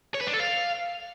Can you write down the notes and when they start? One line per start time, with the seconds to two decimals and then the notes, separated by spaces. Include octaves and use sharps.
0.14 C#5
0.21 B4
0.27 D4
0.33 A4
0.40 F5